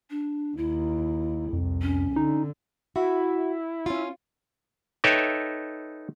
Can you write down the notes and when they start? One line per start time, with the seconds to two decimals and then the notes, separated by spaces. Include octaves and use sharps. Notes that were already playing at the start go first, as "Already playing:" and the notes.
0.10 D4
0.57 D#2 E4
1.53 C2 F2
1.82 C#4
2.16 D3 D#4
2.96 E4 F#4
3.86 C#4 F4
5.04 D#4 A4 B4 C#5 E5 G5